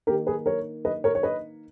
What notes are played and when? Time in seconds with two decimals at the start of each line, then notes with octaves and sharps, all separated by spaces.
0.07 D#3 A#3 D#4 G4 A#4
0.27 G#4 B4
0.46 A#4 C#5
0.85 B4 D#5
1.04 A#4 C#5
1.15 C#5
1.23 B4 D#5